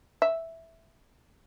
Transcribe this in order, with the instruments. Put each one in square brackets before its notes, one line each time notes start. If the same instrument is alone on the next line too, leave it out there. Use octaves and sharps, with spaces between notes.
[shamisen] E5